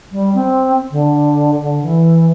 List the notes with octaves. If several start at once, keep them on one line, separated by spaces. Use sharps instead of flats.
G3
C4
D3
D3
E3